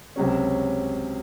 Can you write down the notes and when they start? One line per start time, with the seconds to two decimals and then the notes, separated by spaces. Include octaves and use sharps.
0.16 C#2 C3 F#3 C#4